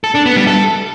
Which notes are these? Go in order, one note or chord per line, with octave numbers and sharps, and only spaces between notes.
A4
D4
B3
G3
A4